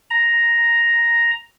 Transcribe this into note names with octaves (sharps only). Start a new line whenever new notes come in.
A#5